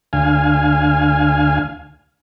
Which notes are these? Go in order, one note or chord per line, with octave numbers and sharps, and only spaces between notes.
D2 F5 G#5